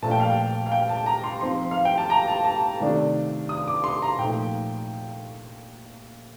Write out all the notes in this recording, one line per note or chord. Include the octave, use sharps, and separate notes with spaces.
A#2 F3 A3 D4 A5
G5
F5
G5
F5
G5
A5
A#5
C6
F3 C4 D#4 C6
F5
G5
A5
A#5
A5
A5
C3 D#3 A3 D4
D#6
D6
C6
A#5
A#2 F3 A3 D#4 G5